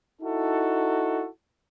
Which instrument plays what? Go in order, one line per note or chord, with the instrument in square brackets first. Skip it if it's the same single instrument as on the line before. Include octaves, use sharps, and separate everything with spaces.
[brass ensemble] D#4 E4 F#4 A4